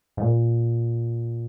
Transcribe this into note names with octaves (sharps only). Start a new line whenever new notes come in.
G#2
A#2